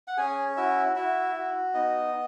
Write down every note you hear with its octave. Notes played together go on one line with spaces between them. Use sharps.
F#5
C#4 G#4 G#5
E4 F#4 E5
E4 F#4 E5
F#4
B3 D#4 D#5